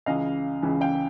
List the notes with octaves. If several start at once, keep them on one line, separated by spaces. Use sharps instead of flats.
C#2 C#3 E3 D#5 F5
C#2 C#3 E3
F5 G5